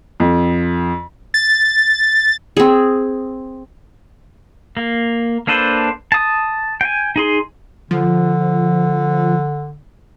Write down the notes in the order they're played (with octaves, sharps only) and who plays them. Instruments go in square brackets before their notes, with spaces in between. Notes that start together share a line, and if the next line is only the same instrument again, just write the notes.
[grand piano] F2
[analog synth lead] A6
[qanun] C4 G#4
[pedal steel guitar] A#3
A#3 D4 A4 B4 C5
A5 D#6
G5 G#5
D#4 G#4 C6
[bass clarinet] D3 [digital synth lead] F3